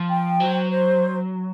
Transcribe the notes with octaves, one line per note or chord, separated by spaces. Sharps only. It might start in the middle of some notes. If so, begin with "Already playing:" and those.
Already playing: F3
G5
F#3 C5
C5